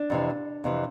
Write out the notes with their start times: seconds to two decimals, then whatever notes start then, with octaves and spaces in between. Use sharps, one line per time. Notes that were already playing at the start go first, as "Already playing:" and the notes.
Already playing: D4
0.10 F2 C3 E3
0.64 F2 C3 E3